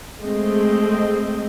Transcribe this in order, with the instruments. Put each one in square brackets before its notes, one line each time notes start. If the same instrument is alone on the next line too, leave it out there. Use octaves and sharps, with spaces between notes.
[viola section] G#3 A3 C4 D#5